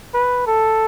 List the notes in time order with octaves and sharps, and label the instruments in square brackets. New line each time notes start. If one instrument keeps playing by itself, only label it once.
[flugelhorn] B4
A4